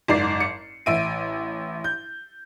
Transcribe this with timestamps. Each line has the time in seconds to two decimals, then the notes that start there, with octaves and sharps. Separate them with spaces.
0.08 F#1 G#2 D5 C7
0.40 C#7
0.86 A1 E5 D7 D#7
1.84 G6